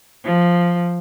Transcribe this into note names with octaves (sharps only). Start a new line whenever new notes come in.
F3